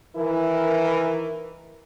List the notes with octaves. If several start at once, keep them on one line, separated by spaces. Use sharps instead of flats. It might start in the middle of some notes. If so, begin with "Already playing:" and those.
D#3 E3 E4 A#4